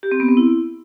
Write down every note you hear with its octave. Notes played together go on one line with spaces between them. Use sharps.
G4
C4
B3
C4
E4